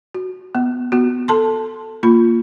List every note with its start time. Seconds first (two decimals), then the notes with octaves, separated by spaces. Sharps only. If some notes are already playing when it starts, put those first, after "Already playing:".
0.14 F#4
0.55 B3
0.92 B3 F#4
1.28 A4 A5 C6
2.03 A#3 F4 B5